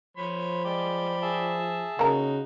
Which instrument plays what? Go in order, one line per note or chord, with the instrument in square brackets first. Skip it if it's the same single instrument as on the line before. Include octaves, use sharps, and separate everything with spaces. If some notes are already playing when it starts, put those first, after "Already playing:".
[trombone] F3 [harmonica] C5 C#5 B5
[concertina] G#3 [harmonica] D5 G5 B5
[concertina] G#4 E5 A5
[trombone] C#3 [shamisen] A#3 A#5 [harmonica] D#4 F#4